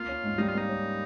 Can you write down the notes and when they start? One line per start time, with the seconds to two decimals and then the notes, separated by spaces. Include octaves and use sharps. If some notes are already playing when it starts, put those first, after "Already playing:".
Already playing: A#3 F4
0.08 C#4
0.23 G#2
0.38 G3 D#4
0.48 F4
0.54 A#3 D#4
0.69 C#4